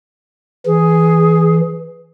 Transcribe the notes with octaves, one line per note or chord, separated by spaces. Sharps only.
E3 G#4